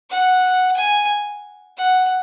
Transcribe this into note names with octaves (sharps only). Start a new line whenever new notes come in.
F#5
G#5
F#5